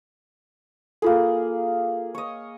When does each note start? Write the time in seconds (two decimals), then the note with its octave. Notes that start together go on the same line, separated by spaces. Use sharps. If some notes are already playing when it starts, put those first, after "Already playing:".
1.02 A#3 F4 G#4 A4
2.14 C#5 D#5